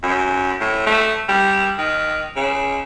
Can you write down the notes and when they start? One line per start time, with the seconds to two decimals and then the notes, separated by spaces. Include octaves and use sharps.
0.03 F#2
0.60 A2
0.86 A3
1.29 G3
1.78 D#3
2.36 C#3